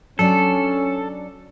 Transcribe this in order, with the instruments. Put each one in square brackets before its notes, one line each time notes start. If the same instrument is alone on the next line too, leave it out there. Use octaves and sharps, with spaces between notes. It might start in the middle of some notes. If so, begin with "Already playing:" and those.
[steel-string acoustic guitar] F#3 D4 D5 [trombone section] C#4 [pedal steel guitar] A4